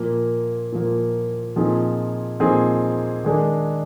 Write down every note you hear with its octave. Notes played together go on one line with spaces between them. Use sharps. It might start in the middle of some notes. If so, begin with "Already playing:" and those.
Already playing: A#2 F3 A#3
A#2 F3 A#3
A#2 F3 C4 D#4 G#4
A#2 F3 C4 D#4 G#4
D#3 G#3 D4 G#4